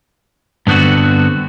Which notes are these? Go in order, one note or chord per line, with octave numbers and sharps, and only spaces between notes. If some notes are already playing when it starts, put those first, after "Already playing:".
G2 D3 B3 C4 F#4